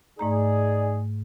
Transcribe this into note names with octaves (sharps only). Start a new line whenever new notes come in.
G#2 A3 D#4 G#4 D5 A#5